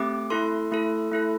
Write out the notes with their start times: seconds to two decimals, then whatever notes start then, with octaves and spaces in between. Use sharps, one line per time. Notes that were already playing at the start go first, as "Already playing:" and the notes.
Already playing: A3 C4 G4 D6
0.30 A3 E4 A4 C6
0.71 A3 E4 A4
1.11 A3 E4 A4